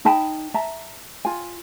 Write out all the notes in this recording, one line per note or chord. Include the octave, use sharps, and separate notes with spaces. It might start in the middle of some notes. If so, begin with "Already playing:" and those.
D#4 G5 A5 B5
E5 A5 A#5
F4 G#5